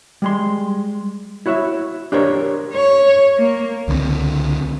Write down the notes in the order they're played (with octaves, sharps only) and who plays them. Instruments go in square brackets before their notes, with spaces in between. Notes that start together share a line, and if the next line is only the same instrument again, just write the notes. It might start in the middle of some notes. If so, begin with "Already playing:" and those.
[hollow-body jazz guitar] G3 G#3 C6
E4 F#4 C#5 E5
D4 G4 A#4 C5 C#5
[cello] C#5
A#3
[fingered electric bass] C#2 D3 G3 C4